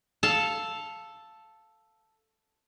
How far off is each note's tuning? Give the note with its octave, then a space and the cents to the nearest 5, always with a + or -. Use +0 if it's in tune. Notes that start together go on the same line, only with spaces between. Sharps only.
A4 +0 F5 +0 A5 +0